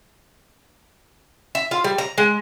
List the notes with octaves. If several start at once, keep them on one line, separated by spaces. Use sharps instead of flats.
E5
F4
G3
A#5
G#3